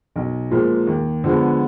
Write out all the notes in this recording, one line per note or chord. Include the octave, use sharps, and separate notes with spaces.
B1
A#2 F3 G#3
D#2
D3 F3 G#3 B3